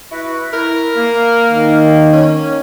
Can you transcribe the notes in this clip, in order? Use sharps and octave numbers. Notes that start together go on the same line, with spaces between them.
E4 F#4 B4
E4 A#4
A#3
D#3
C#4